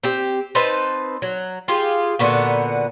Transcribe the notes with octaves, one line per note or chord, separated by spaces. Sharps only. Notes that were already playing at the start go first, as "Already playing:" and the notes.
C4 G4
C4 D#4 B4 A5
F#3
F4 G4 G#4
A#2 D3 B3 F#4